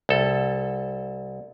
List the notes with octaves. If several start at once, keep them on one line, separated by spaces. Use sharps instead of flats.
C2 A4